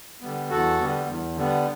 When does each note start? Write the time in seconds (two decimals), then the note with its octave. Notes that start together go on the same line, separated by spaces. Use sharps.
0.21 D3 G3 B3
0.50 E2 F#4 A4
0.79 D3 G3 B3
1.08 E2
1.37 D3 G3 B3